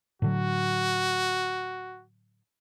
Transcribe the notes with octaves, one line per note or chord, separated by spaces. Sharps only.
A2 D3 F#3 F#4